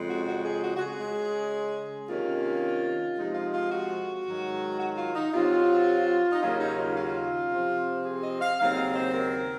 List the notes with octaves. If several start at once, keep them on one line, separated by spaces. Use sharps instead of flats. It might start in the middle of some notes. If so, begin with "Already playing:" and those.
Already playing: F2 C#3 G#3
F#4
F#4
G#4
F#4
F#4
G#4
C#3 G#3 C#4
C3 D#3 A#3 C#4 F4
C3 F3 G#3 D#4
F4
F4
F#4
G#2 D#3 F#3
F#4
F4
D#4
C3 F#3 C4 F4
D#4
D#2 C#3 F#3 A#3 C#4 F4
D#4
F4
F4
C3 F3 C4
G#4
D#5
F5
D#2 C#3 F#3 C4 F5
D#5
C5
A#4